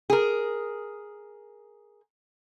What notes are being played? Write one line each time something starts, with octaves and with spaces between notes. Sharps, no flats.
G#4 A#4